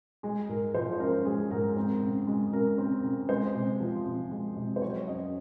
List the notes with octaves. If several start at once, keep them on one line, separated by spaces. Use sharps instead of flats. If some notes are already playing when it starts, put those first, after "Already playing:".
G#3 G#4
G#2 A#4
F3 C5
C5
C#4 A#4
G#3 G#4
G#2 A#4
C4
C#3
G#3
C#3 A#4
C4
C#3
G#3 C5
C3
F3
C3
G#3
C3
C5
F#3 C#5
F#2 D#5